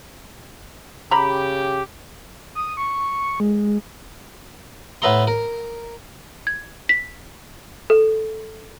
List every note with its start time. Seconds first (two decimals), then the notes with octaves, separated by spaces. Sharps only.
1.11 C#3 G4 A#5 B5
2.55 D#6
2.77 C#6
3.40 G#3
5.02 A2 B3 E5 A#5 C6
5.27 A#4
6.47 G#6
6.89 B6
7.90 A4